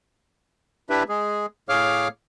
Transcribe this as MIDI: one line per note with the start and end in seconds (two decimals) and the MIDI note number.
0.90 1.03 62
0.90 1.03 64
0.90 1.03 67
0.90 1.03 71
0.90 1.03 76
1.09 1.46 56
1.09 1.46 68
1.69 2.08 45
1.69 2.08 68
1.69 2.08 73
1.69 2.08 77
1.69 2.08 86
1.69 2.08 89